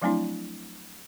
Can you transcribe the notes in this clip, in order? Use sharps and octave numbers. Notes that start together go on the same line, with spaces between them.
F3 F#3 A3 C4 D4 E4